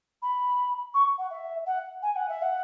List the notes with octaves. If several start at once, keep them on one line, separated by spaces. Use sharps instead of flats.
B5
C#6
F#5
E5
F#5
G#5
F#5
E5
F#5